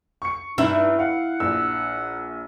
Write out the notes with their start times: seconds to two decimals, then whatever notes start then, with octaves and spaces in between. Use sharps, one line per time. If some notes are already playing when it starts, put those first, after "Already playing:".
0.22 C#6 C#7
0.58 G2 D#4 E4
0.99 F5 F#5
1.40 A#1 E6